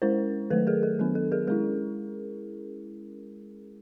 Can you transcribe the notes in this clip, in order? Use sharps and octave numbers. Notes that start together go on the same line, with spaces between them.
G#3 C#4 E4 A#4 C5
D#3 F#3 A3 A4 B4
G#4 A#4
A4
D#3 F#3 B3 D4 A4
A4
G#4 A#4
G#3 C#4 E4 G#4 A#4